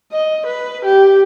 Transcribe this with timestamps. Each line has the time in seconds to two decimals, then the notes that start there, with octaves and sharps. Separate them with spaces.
0.12 D#5
0.46 B4
0.84 G4